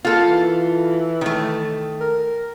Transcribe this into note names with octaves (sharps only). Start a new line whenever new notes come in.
A#3 F4 A4
E3
D#3 A3
A#4